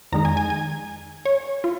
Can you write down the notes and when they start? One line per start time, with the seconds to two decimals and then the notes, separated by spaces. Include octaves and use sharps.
0.12 F2 D#3 G#3 D#4 A#5
0.25 G#5
0.37 G#5
0.50 G#5
1.25 C#5
1.64 F4